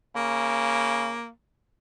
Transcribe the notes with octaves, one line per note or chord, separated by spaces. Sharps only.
C#3 A#3